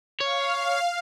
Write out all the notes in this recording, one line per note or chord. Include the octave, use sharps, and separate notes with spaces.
C#5 F5